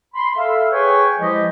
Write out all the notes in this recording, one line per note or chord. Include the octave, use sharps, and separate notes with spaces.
B5 C6
A4 E5 F5
G#4 B4 C#5 G5 G#5 C#6
F3 G#3 E4 G4 D#5